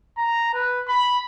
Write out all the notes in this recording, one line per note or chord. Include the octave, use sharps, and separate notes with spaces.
A#5
B4
B5